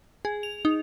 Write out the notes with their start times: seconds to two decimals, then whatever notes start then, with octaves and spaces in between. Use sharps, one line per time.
0.25 G#4
0.43 F7
0.65 D#4